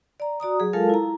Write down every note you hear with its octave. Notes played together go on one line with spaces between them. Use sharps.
D5 A#5
F#4 D5 A#5 D#6
F#3 G#4
G#3 F4 A4 A#4 F5 A5
E4 A#5